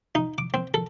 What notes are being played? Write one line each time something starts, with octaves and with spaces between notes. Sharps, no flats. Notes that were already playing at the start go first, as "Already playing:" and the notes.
D#4
D6
C4
A4